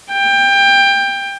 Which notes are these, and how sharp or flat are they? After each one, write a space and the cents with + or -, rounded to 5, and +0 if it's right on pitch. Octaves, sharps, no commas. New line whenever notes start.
G5 +20